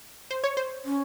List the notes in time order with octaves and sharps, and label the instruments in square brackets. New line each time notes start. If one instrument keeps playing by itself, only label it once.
[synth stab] C5
C#5
C5
[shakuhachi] C#4